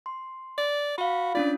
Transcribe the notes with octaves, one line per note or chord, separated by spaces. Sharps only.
C6
D5
F#4 F5 B5
C#4 D4 F4 D5